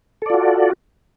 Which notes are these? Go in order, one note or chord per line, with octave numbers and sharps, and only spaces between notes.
F4 F#4 A4 D5